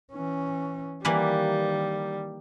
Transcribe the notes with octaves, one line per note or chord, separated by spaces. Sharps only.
E3 C#4
D#3 E3 G3 A#3 B4